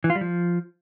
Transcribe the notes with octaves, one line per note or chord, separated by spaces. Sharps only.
E3
F4
G3
F3